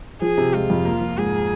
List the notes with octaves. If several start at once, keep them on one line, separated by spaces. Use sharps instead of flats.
F3 G#4
C3
G#3 F4
F2
A#3
F3
G#2 G#4